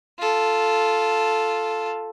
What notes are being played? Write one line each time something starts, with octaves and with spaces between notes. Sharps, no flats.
F4 A4